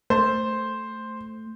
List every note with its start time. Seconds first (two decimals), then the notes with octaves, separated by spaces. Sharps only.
0.10 A3 C5